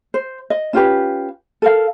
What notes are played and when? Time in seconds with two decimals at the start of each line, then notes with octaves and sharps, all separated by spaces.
0.14 C5
0.50 D#5
0.73 C#4 F4 G4 B4
1.62 A4 A#4 F5